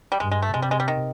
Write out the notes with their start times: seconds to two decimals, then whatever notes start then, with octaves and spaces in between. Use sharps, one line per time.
0.12 G3
0.20 G2 G#3
0.32 G#3
0.42 A3
0.54 C3 G#3
0.62 G3
0.71 G#3
0.80 G3
0.88 D#3